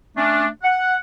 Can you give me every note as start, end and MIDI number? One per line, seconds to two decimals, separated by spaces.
0.17 0.45 57
0.17 0.45 61
0.17 0.45 62
0.63 0.97 78